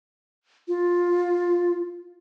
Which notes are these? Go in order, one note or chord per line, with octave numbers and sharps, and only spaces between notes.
F4